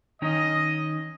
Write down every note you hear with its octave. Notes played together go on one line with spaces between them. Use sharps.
D#3 C#4 D#4 D#5